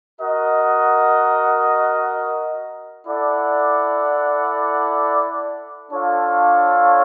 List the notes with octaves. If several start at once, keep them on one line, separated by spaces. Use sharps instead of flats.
F#4 A#4 D#5 F#5
E4 A4 D5 F#5
D4 F4 A4 C#5 F5